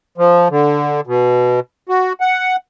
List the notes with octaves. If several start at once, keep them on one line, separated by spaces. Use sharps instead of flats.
F3
D3
B2
F#4
F#5